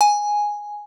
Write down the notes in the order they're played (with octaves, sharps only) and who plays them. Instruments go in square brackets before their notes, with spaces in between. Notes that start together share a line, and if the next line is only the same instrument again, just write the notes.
[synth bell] G#5